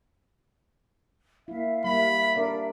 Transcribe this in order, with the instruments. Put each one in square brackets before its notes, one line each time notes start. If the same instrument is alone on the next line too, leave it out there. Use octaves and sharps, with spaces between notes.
[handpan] A#3 E4 [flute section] E5 F5
[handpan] G3 A#3 [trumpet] B5
[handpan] D4 A#4 D5